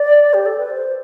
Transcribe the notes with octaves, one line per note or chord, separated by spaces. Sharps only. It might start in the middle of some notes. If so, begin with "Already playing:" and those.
Already playing: D5
G4
A4
B4
C5